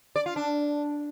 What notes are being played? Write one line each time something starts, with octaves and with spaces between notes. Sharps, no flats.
D5
F4
D4